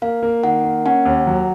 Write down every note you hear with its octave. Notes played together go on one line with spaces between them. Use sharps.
A#3 F5
A#3
D#3 F#5
A#3
C#4 F#5
D#2
F#3